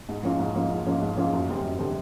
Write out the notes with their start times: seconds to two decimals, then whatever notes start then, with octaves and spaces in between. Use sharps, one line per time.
0.09 G#2
0.23 F3 A#3 C#4 F4
0.39 G#2
0.55 F3 A#3 C#4 F4
0.71 G#2
0.85 F3 A#3 C#4 F4
1.02 G#2
1.17 F3 A#3 C#4 F4
1.33 F#2
1.48 D3 G3 C4
1.64 F#2
1.79 D3 G3 C4